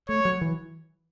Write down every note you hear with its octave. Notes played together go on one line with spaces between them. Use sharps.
A3 C#5
F#3
E3